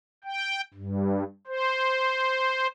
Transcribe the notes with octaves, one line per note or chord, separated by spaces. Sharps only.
G5
G2
C5